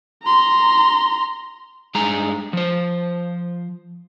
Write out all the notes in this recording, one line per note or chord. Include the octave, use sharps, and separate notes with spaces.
A#5 C6
G2 G#3 G#4 A#5
F3 C5